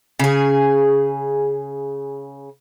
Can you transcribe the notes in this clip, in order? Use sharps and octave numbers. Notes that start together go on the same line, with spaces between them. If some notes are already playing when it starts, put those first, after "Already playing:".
C#3 G#4